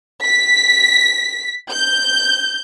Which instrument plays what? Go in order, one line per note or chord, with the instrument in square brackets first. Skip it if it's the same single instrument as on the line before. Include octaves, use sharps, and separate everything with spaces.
[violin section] B6
G6